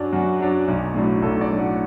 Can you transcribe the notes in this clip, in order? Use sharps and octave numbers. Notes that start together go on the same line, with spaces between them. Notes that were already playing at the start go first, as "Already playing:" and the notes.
Already playing: F#2 F#3 D4 F#4
F#2 F#4
F#3 D4
B1
A2 F#3 D4
B1 A4
D5
A2 F#3 D4
F#5